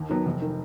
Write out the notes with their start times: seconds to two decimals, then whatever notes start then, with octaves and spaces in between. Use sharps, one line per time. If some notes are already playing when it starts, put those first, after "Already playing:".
Already playing: D#2
0.09 D#3 F#3 B3
0.26 F1
0.42 D#3